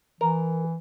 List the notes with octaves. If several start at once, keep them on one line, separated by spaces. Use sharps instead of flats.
E3 A#4